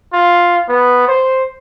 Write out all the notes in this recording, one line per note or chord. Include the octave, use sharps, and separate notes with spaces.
F4
B3
C5